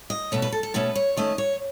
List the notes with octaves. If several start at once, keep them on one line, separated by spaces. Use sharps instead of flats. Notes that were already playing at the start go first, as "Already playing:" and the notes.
D#5
B2 A3 C#4 B4
B4
A4
A4
B2 A3 C#4 B4
C#5
D#3 A3 C#4 D#5
C#5